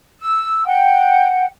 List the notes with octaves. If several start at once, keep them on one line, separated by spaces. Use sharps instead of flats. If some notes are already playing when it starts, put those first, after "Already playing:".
E6
F#5 G5